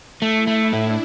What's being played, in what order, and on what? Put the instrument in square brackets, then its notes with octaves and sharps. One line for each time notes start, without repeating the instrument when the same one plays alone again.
[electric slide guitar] A3 [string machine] E4
[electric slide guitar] A3
[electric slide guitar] A2 [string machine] D4